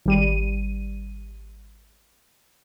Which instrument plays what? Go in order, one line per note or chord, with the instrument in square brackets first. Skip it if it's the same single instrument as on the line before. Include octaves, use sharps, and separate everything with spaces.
[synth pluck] G#1 G3 D#7